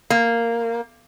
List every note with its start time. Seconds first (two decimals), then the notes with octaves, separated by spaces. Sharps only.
0.10 A#3